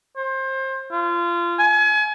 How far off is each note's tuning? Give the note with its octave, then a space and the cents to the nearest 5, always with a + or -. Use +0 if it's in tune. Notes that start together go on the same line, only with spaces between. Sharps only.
C5 +25
F4 -25
G#5 +35